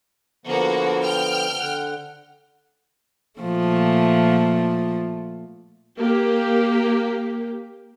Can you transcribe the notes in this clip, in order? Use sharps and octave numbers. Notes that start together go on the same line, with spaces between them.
D3 F3 A#3 B3 F#4
G5 F6 G6
D3 F#5
A#2 F3 A3
A#3 G4